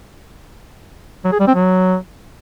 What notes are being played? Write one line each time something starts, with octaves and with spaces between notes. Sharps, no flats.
F#3
G#4
G3
C4
F#3